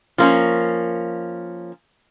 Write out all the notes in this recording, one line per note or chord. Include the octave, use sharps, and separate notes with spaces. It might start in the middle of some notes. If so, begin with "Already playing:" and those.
F3 A#3 C#4